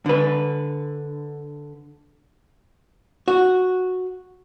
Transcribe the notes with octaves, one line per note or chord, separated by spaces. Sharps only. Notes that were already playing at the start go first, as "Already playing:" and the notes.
D3 B4
F#4